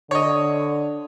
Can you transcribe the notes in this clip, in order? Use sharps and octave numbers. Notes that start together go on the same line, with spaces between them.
D3 C#5 D#5